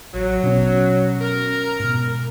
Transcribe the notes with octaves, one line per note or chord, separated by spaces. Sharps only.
A1 F#3
B2 C#4
A#4
G#2 B2